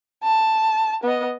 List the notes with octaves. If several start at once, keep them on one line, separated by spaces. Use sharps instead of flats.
A5
B3 D#5